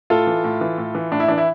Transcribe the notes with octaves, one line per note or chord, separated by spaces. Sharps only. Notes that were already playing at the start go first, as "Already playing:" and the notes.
A2 F4 A4
E3
A2
E3
A2
E3
A2 D4
E4
E3 D4
E4